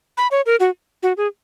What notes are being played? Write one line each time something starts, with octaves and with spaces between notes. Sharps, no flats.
B5
C#5
A#4
F#4
F#4
G#4